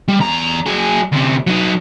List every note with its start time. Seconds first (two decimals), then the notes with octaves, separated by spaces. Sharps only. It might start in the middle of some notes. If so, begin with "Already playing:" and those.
0.08 G3
0.20 E2 A#5
0.66 F#3 G#4
1.12 D2 C3
1.47 F#3 D#4